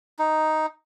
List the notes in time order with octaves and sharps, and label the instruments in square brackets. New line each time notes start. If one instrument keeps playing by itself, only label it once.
[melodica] D#4